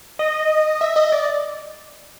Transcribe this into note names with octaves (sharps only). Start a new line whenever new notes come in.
D#5
E5
D#5
D5